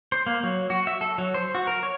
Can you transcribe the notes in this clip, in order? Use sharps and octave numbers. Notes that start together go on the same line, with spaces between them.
C5
A#3
F#3
F#4
E5
A4
F#3
C5
F#4
A#4
C#5